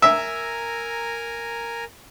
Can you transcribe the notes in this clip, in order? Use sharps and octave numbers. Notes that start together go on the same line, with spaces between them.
A#4 E5 G#5 A#5